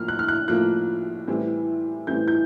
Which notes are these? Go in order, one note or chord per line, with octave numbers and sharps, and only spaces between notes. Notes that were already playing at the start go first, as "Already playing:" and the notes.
Already playing: A2 F3 A#3 F6
F#6
F6
F#6
A2 F3 A#3 F#6
A2 E3 G3 C4
A2 E3 G3 C4 G6
G6